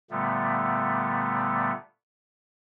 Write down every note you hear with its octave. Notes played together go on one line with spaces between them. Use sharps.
A#2 D3 G3 A3 B3